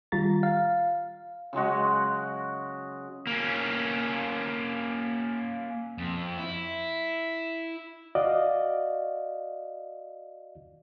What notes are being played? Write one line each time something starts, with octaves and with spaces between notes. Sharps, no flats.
D#3 G3 F4 A#5 A6
F5
C#3 F#3 G#3 F#4
A#3 C#4
F2
E4
F#4 D5 D#5 F5